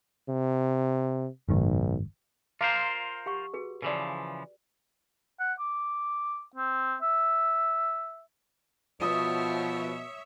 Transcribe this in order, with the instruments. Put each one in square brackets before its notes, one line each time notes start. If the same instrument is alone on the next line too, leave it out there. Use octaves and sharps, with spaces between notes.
[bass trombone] C3
[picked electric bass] F#1 G#2 D#3 [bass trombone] B1
[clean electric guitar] F4 A#4 C5 [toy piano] F5 A#5 D6
[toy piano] G4 F#5 C#6
F#4 G#4 B4
[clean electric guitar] C#3 E3 F3 [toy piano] B4 D5
[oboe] F#5
D6
C4
E5
[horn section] B2 [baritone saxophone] F3 [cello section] C#5 E5 [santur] D#6